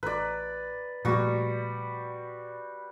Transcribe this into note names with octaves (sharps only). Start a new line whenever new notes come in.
A1 B4 D5
A#2 F3 G3 A3 F#4